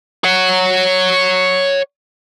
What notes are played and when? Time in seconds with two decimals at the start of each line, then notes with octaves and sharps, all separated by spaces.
0.24 C#5 F#5